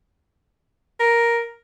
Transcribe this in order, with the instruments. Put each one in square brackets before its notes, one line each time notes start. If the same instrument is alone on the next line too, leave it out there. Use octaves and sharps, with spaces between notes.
[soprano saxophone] A#4